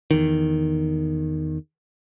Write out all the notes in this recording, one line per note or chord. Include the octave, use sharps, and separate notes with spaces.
E2 D#3